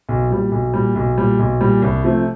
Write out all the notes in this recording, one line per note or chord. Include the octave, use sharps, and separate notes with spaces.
B1
A#2 G3
B1
A#2 G3
B1
A#2 G3
B1
A#2 G3
C2
C3 F3 A3